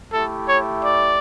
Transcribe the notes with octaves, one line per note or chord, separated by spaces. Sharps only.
A3 E4 G4 A4
C#5
D5